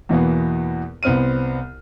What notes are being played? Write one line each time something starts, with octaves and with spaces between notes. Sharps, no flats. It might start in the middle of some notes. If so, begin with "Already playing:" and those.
E2 B2 E3 A#3 B3
C2 B3 C4 F6 D#7